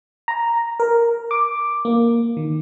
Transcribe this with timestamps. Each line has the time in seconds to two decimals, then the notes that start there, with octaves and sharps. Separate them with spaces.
0.28 A#5
0.80 A#4
1.31 D6
1.85 A#3
2.37 D#3